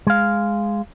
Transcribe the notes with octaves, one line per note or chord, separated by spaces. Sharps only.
G#3 F5